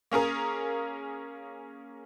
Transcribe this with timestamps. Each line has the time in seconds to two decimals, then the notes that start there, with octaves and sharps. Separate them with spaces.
0.12 A#3 C#4 G#4 A#4